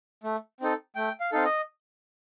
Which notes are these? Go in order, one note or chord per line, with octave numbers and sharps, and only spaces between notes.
A3
C4 D#4 A4
A3 G5
F5
C4 D#4 A4 F5
D#5